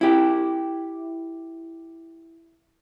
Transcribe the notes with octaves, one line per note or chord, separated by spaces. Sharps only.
E4 G4